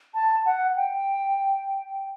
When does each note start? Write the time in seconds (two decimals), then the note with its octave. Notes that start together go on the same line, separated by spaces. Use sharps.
0.14 A5
0.46 F#5
0.76 G5